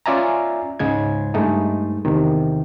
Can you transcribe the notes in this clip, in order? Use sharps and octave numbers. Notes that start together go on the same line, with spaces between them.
C#4 F4 D5 E5 G#5 A#5
C#2 G#2 C#3 G#3 G#6
G2 G#3 A3 D#4
E2 C3 D#3